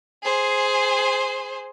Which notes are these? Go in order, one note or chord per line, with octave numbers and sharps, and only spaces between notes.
G#4 C5